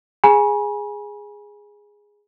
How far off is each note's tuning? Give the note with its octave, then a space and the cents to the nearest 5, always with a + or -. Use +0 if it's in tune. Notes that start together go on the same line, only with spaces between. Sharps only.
G#4 -5 G#5 +0 B5 -45